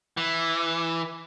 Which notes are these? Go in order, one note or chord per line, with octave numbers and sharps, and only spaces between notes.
E3